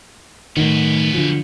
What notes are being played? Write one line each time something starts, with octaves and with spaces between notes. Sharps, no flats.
F#2 A2 D#3 B3
D3 F3